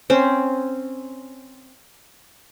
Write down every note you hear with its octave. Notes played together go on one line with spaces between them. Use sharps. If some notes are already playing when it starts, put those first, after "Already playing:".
C4 C#4 C5